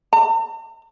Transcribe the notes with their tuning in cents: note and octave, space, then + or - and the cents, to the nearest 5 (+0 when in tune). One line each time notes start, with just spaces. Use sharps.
A5 +45